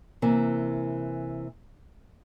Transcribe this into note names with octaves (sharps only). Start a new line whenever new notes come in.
C3 E3 A#3